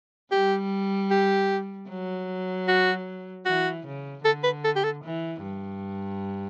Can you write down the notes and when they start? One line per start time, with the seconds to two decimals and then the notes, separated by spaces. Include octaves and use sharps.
0.32 G3 G4
1.11 G4
1.89 F#3
2.68 F#4
3.46 E3 F#4
3.86 C#3
4.25 D3 A4
4.44 B4
4.64 A4
4.76 G4
4.84 A4
5.04 E3
5.43 G2